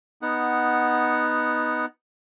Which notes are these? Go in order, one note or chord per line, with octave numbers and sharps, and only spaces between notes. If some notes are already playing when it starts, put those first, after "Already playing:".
B3 D#4 F#5